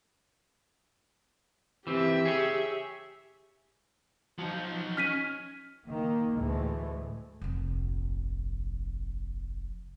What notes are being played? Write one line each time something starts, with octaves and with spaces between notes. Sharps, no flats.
E3 C4 G4 E5
G#4 C#5
F3 F#3 D#4
C#4 F6 B6 D#7
D#3 A#3
D2 A2 E3 G#3 A3
F1 A#1